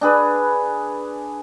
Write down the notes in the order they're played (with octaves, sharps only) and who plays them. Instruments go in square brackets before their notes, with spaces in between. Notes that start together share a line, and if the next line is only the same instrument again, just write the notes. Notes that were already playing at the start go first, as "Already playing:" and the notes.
[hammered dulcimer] D4 G#4 B4